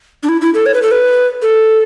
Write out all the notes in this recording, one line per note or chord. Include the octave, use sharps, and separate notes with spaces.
D4
E4
E4
A4
C#5
B4
A4
B4
A4